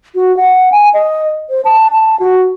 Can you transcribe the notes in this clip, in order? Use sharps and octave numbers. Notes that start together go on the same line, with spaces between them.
F#4
F#5
G#5
D#5
C5
A5
A5
F#4